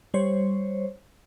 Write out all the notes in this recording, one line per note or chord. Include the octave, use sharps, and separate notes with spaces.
G3 C5 C#5